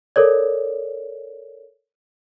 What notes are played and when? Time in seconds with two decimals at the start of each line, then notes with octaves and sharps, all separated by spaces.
0.16 A4 A#4 C#5 D5